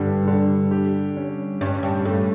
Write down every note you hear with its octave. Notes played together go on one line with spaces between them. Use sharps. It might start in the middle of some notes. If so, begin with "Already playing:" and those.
Already playing: G2 D3 G3
D3
G4
C#4
G2 C#4
G2
G2 A3